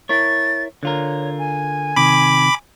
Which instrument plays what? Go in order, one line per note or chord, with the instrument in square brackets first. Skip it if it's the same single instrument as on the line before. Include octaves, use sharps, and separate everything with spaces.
[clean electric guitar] E4 A#4 C#5 [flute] A6
[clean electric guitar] D3 F4 A#4 [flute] C#5
[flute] G#5
[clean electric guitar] C3 D#3 [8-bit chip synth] B5 D6